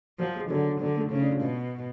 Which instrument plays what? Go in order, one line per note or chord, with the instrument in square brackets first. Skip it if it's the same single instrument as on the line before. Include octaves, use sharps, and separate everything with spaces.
[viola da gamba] F3 [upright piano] F#3
[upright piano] G#3
[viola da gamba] D3 [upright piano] F#3
[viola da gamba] D3 [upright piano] F#3
[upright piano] A3
[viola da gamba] C#3 [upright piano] C#4
[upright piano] D4
F4
[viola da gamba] B2